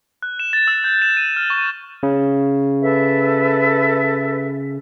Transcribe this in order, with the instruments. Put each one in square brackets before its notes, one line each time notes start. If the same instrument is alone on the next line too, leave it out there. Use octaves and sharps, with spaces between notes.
[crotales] F#6
E7
A6
E6
G6
E7
D#7
F6
C#6
[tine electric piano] C#3
[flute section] A4 B4 E5